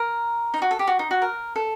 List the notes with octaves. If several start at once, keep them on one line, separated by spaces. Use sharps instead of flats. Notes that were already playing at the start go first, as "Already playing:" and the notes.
Already playing: A#4
D#4
F#4
A4
G4
F#4
D#4
F#4
A#4
A4